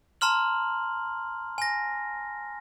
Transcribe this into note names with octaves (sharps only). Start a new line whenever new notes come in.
A5 A#5 C6 F6 F#7
G#5 A#6